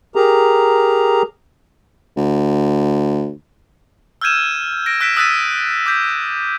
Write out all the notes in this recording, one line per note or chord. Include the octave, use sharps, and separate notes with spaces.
G4 G#4 A#4 A#5
D2
E6 F6 G6 G#6 D#7 E7
A#6 D7
E6 F#6 B6 D7 E7
D#6 E6 F#6 A6 B6 D#7
D6 G6 B6